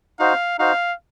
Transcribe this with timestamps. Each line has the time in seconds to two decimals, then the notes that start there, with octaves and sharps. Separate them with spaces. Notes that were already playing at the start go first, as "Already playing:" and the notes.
0.19 D#4 F#4 C5 F5
0.59 D#4 F#4 C5 F5